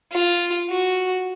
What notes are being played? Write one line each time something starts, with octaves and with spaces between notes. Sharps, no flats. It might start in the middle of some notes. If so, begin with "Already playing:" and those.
F4
F#4